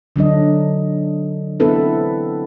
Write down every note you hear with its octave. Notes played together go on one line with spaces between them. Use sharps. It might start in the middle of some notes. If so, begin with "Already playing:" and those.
D3 F#3 D4 D#5
B3 C4 D4 E4 A4 B4